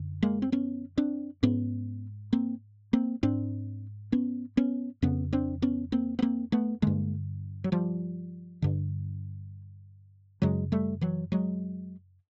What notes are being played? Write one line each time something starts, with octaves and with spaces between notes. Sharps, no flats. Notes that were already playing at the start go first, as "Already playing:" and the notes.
Already playing: F#2 D3
G#3 A#3
C4
B3 C#4
C4 D4
G#2 B3 C#4
A#3 C4
A#3 C4
G#2 C4 D4
B3 C#4
B3 C#4
F2 C#3 B3 C#4
C4 D4
B3 C#4
A#3 C4
B3
A#3 C4
A3 B3
G2 D3 G#3 A#3
F#3
F3 G3
G2 D3
F#2 C#3 F#3 G#3
G3 A3
E3 F#3
F#3 G#3